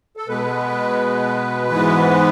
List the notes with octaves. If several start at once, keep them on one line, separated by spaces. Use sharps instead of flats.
A4
B2 G#3 B3 B4
G#2 E3 G#3 B3